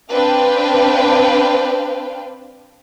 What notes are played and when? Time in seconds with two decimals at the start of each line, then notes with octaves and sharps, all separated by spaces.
0.12 C4 D4 B4 F5 G5